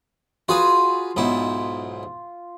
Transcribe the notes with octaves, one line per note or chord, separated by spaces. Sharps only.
F4 F#4 G#4 B4
B1 G#2 E4